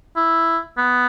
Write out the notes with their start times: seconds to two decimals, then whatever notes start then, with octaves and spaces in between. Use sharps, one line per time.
0.16 E4
0.78 B3